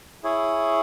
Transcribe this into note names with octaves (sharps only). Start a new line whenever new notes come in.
E4 G#4 C#5